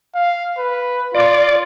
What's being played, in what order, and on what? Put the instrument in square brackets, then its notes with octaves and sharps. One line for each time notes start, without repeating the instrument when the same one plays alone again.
[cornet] F5
B4
[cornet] F4 [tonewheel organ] D5